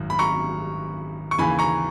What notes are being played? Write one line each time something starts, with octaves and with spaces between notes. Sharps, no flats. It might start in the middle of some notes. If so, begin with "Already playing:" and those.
Already playing: G#1 F#2
B5
A#5 C#6
C#6
D#2 C#3 E3 G#5 B5
A#5 C#6